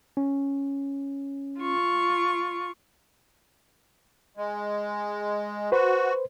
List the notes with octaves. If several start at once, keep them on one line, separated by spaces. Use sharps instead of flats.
C#4
F4 C#6
G#3
F#4 B4 C5